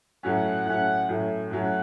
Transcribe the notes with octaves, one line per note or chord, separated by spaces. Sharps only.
A2 F#3 C#4 F#5
A2 F#3 C#4 F#5
A2 F#3 C#4
A2 F#3 C#4 F#5